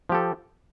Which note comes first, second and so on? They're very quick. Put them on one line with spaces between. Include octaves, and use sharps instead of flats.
F3 G4 A4